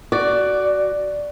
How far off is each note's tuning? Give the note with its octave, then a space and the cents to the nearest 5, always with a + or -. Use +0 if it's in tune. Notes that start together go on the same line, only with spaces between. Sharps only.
F#4 +15 D5 +0